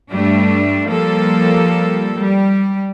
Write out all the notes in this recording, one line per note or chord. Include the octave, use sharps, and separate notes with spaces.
G2 G3 A3 D4
F3 G3 A#3 A4
G3